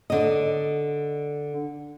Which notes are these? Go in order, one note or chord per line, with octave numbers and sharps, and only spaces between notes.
D3 D#5